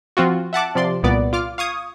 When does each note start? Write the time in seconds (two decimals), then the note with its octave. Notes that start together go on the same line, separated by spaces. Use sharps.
0.17 F3 C4 F4 F#4
0.53 E5 F#5 A5 D6
0.75 C3 F3 D5 C6
1.03 C2 A#2 B3 D5 D6
1.33 F4 D6 F6
1.58 F5 C#6 D#6 G#6